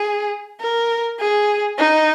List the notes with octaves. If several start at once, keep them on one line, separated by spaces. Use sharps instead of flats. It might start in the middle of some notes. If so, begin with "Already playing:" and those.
Already playing: G#4
A#4
G#4
D#4